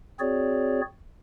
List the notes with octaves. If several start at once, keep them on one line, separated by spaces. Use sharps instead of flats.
C4 F#4 G#4 C#5 D5